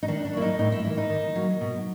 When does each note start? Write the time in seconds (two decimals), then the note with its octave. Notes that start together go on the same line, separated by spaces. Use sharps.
0.03 D#4
0.08 D#3 D4
0.25 D4
0.33 F#3 A#3 E4
0.42 D#4
0.59 A2 D#4
0.72 E4
0.84 E3 G3 A#3 E4
0.97 D#4
1.10 D#3
1.35 F#3 A#3
1.61 B2